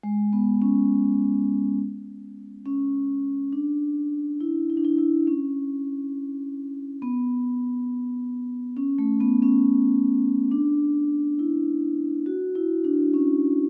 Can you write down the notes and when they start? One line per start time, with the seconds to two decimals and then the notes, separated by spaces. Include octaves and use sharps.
0.03 G#3
0.33 B3
0.62 C#4
2.66 C#4
3.53 D4
4.41 E4
4.70 E4
4.77 D4
4.85 E4
4.98 E4
5.27 C#4
7.02 B3
8.77 C#4
8.99 A3
9.21 B3
9.42 C#4
10.51 D4
11.39 E4
12.26 F#4
12.55 E4
12.84 D4
13.14 C#4